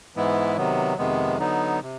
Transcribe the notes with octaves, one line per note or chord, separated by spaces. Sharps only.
G#2 E3 G#3 B3 E4
C3 D#3 F#3 B3
F2 C3 D#3 G#3 B3
D3 F#3 B3 D#4
C3